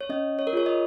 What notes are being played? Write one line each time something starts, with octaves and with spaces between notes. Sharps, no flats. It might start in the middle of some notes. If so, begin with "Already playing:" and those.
C#5
C#4 D#5
C#5
A#4
F4 G#4 C#5
D#5